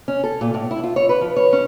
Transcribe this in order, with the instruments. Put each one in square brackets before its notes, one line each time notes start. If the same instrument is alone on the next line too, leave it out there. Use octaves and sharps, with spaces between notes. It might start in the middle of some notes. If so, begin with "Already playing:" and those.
[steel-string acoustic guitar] C#4
A4
A#2
A2
E4
F4
C#5
B4
F3
C#5
C#4